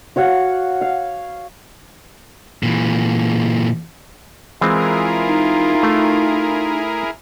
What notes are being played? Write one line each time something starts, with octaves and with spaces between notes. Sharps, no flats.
F#4 C#5 F5 F#5
F5
A#2 E3
E3 G#3 C4 E4 F4 G#4 A#4
D#4
A3